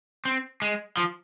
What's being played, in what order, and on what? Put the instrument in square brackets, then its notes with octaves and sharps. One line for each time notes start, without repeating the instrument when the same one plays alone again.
[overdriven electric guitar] C4
G#3
F3